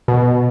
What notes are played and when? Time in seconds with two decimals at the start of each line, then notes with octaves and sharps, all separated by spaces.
0.08 B2